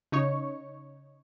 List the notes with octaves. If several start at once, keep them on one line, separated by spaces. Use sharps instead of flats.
C#3 D#4 C#5 C#6